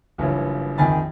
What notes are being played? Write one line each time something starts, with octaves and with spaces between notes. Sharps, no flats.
F#1 G2 E3 E4 F4 C#5
A#1 F2 D#3 G#5 B5 A6